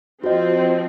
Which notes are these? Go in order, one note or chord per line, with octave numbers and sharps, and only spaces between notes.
F3 C4 F#4 D#5